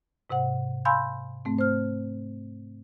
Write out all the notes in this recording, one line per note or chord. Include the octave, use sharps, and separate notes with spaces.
G#2 C3 C5 F#5
F5 G#5 B5 C6 E6 G6
G#2 A3 C4
C5 F6